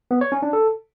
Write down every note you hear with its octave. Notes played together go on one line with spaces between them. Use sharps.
B3
C#5
C#4
D4
A4